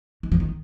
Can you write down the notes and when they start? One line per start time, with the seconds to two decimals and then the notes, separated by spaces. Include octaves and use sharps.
0.23 D#3
0.32 F3
0.40 D#3